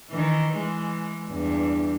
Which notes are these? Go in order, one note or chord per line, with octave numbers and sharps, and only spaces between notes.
D#3 E3
E3 G#3
E2 G2